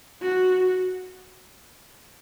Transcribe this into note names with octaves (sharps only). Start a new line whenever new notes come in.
F#4